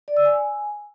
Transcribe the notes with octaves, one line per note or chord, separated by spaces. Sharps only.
D5
E6
G#5